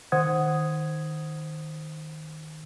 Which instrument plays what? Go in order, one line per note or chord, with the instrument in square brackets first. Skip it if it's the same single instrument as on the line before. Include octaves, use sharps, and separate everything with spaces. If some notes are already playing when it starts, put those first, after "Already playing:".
[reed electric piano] D#3 C5 F#5 D#6 G#6